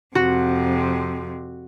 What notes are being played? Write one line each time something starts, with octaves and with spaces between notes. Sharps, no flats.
F2 C3 F#4